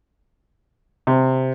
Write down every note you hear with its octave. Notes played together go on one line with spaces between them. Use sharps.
C3